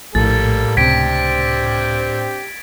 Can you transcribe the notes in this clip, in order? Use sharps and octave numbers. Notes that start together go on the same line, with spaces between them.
A#1 A2 G3 A#3 A4 A6
C#2 C3 C4 D4 G4 G#6 B6 D7